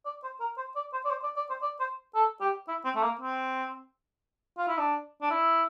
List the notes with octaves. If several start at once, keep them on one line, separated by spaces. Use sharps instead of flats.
D5
C5
A#4
C5
D5
C5
D5
C5
D5
D5
C5
D5
C5
A4
G4
E4
C4
A3
A#3
C4
F4
E4
D4
D4
E4